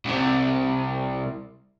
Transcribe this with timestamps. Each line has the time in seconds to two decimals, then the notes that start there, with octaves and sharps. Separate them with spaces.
0.05 C2 C3